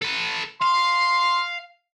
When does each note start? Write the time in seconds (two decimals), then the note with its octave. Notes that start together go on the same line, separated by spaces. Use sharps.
0.02 A4 B4
0.61 F5 C6